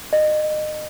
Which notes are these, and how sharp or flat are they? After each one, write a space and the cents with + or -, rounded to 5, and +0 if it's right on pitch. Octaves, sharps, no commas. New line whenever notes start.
D#5 -25